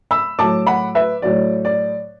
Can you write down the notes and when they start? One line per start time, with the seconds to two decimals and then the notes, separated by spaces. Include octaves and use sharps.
0.11 B5 E6
0.39 A2 F#3 A5 D6
0.67 F#5 B5
0.95 B4 E5
1.22 A2 F#3 D5
1.65 D5